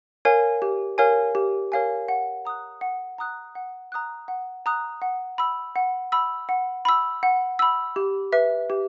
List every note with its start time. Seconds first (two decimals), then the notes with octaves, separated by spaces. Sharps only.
0.25 A#4 C#5 F5 G#5
0.62 G4
0.98 A#4 C#5 F5 G#5
1.35 G4
1.72 A#4 C#5 F5 G#5
2.08 F#5
2.45 A#5 D#6 F#6
2.81 F#5
3.18 A#5 D#6 F#6
3.55 F#5
3.92 A#5 D#6 F#6
4.28 F#5
4.66 A#5 D#6 F#6
5.02 F#5
5.38 B5 E6
5.76 F#5
6.12 B5 E6
6.49 F#5
6.85 B5 E6
7.23 F#5
7.59 B5 E6
7.96 G4
8.32 B4 E5
8.70 G4